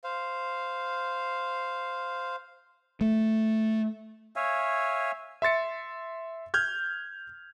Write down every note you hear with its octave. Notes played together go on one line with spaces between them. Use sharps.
C5 F5
A3
C#5 E5 F5 G#5
E5 C6 A6 C#7
F6 G6 G#6